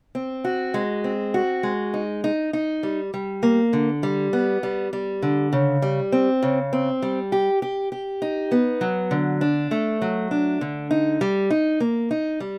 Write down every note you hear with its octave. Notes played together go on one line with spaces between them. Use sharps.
C4
F#4
G#3
C4
F#4
G#3
D#4
D#4
D#4
G3
G3
A#3
D3
G3
B3
G3
G3
D3
C#3
G3
C4
C#3
C4
G3
G4
G4
G4
D#4
B3
F#3
D3
D4
A3
F#3
D4
D3
D#4
G3
D#4
A#3
D#4
G3